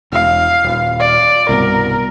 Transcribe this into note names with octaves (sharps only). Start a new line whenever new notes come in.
E1 F5
D#1
D5
C2 G2 B2 A#4